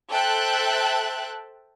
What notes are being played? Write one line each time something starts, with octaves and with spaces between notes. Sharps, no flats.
A4 C5 E5 G5 A5 F#6